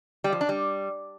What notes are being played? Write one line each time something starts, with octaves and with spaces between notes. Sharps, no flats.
G3
F3
D4
G3